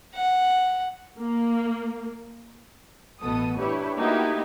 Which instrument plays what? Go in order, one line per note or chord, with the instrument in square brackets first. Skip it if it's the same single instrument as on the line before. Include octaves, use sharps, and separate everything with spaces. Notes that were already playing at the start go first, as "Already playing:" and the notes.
[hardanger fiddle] F#5
[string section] A#3
A1 B2 B3 A4 D#6
D4 E4 G4 B4 C#5
A3 A#3 D#4 E4 F#4 G4